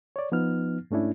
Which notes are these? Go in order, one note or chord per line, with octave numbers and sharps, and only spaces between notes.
C#5 D5
F3 B3 D#4 F6
G#2 A3 C#4 D4 E4